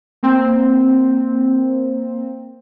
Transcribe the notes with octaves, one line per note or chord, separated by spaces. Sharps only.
A#3 C4